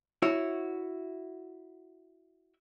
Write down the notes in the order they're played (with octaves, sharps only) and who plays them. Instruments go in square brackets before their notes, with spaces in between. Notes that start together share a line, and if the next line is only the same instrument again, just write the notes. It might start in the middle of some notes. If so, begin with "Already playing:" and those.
[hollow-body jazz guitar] E4 F#4 C#5